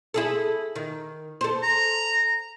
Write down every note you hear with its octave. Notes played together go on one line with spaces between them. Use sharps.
E4 G#4 A4
D#3
A4 C5
A#5